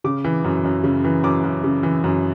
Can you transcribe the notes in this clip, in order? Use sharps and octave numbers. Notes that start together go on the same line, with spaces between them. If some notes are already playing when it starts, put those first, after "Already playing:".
C#3 D6
E3
F#2
F#2
C#3
E3
F#2 D6
F#2
C#3
E3
F#2